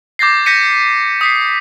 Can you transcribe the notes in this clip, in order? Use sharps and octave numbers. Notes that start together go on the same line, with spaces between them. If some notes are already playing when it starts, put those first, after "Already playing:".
D6 G6 A6 A#6 C7
G6 A#6 B6 C#7 D#7
D#6 B6 C7